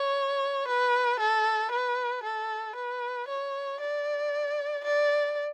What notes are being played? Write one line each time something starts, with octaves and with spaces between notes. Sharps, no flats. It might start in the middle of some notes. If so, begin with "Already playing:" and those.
Already playing: C#5
B4
A4
B4
A4
B4
C#5
D5
D5